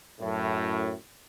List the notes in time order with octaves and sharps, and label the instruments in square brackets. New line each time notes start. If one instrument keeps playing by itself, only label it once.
[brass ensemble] F#2 A2